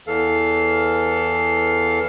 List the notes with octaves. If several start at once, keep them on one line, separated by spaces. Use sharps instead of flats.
E2 E3 A4 F5